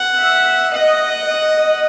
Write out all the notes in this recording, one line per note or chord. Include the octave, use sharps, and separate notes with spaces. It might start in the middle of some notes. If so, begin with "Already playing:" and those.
Already playing: F#5
E5
D#5 F#5
D#5